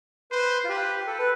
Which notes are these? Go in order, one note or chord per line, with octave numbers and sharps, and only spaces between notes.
B4 C5
F4
G4 B4
A4
B4